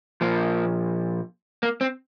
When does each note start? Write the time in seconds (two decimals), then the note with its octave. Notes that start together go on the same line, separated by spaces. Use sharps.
0.21 A#2 F3 A#3
1.63 A#3
1.81 C4